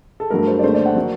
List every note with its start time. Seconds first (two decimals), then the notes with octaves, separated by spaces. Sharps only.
0.20 A4
0.30 G2 F#3 A3 A#4
0.48 C5
0.59 D5
0.63 D#2 D3 A3 C5
0.74 D5
0.86 F#5
0.96 F#3 A#3